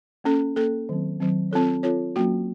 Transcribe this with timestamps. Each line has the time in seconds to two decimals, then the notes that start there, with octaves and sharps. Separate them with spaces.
0.24 A#3 C#4 A4
0.56 A#3 C#4 A4
0.89 D#3 F#3 C4
1.20 D#3 F#3 C4
1.51 C4 F4 A4 C#5
1.83 C4 F4 A4 C#5
2.16 F#3 A#3 C#4 F#4